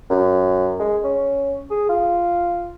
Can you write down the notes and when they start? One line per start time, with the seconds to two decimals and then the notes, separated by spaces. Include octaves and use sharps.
0.10 F#2
0.79 G#3
1.04 C#4
1.70 G#4
1.89 F4